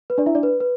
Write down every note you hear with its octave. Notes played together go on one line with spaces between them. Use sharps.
B4
D4 D5
E4 E5
D4 D5
B4
B4